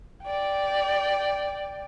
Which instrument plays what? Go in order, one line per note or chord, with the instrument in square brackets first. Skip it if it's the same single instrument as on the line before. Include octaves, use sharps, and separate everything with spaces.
[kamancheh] D5 G5